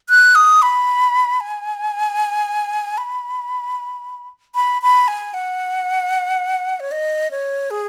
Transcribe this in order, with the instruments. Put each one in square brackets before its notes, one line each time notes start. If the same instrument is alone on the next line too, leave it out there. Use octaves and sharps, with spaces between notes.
[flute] F#6
D#6
B5
G#5
B5
B5
B5
G#5
F#5
C#5
D#5
C#5
G#4